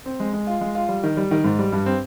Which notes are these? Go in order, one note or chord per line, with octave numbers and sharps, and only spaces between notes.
C4
G#3
G#3
F4
G#3
F4
G3
D#3
G3
D#3
G#2
G3
G2
C4